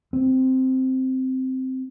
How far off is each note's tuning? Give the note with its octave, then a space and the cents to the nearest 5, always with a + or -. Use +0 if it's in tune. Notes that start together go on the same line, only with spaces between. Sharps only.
C4 -5